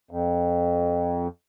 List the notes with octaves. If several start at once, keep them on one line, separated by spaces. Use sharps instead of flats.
F2